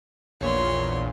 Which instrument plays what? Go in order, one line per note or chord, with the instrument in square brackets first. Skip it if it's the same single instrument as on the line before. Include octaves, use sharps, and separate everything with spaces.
[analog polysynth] A#1 E2 A#2 [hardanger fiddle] C#5 C6